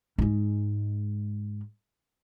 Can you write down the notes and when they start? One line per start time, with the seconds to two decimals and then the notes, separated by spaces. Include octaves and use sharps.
0.18 G#2 G#3